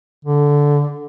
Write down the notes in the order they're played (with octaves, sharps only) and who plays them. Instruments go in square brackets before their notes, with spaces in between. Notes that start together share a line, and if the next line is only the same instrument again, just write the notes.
[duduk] D3